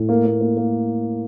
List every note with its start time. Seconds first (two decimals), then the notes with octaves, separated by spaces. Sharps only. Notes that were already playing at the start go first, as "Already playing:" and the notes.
Already playing: A2
0.09 A#3
0.26 A#3
0.41 A#3
0.57 A#3